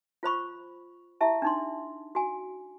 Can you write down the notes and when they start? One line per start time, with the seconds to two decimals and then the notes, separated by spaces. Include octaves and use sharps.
0.23 F4 C5 B5 C#6
1.21 E4 G4 E5 A5
1.42 D4 D#4 C6
2.15 F#4 G#5